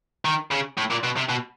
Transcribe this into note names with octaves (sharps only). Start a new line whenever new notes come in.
D#3
C#3
A2
A#2
B2
C3
B2